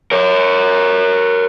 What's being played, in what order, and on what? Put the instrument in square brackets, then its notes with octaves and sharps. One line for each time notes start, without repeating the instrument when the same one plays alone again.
[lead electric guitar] A#4 C#5